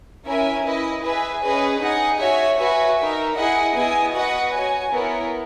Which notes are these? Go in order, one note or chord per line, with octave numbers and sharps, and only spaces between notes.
C#4 E4 A#4 E5 G#5
E4 B4 D#5
G#4 B4 E5 G#5
C#4 G#4 B4 D#5
D#4 G#4 D#5 F#5
F#4 C#5 E5 G#5
F#4 B4 E5 G#5
D#4 A#4 E5
E4 G#4 D#5 F#5
B3 E4 G#4 D#5 G#5
F#4 B4 D#5 F#5
F#4 C#5 G#5
B3 E4 A#4 C#5